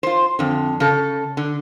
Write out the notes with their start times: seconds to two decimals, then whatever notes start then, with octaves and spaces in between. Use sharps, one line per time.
0.03 F4 C5
0.39 F2 D3
0.80 C#3 A4
1.37 D3